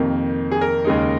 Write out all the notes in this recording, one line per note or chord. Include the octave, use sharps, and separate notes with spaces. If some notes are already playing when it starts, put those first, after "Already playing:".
Already playing: F2 C3 D#3 A#3
G#4
A#4
D#2 C#3 G#3 D#4